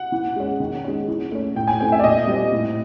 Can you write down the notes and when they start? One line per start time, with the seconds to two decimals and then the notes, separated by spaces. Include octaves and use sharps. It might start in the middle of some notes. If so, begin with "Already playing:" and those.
Already playing: F#5
0.12 E3
0.36 G#3 C#4
0.60 D#3
0.84 G#3 C#4
1.08 E3
1.31 A3 C#4
1.55 A2 G5
1.68 G#5
1.80 E3 A3 C4 G5
1.92 E5
2.00 D5
2.04 A#2 D#5
2.27 G3 C4
2.52 A2